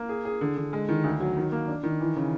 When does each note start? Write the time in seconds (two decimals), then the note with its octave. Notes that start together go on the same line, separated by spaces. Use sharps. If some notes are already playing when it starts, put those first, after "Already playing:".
Already playing: A#3
0.09 G#4
0.25 G#4
0.41 D3
0.57 D3
0.73 G#3
0.89 D#3
1.04 D2
1.20 F#3
1.37 D#3
1.52 A#3
1.68 D4
1.83 D#3
2.01 E3
2.16 C#3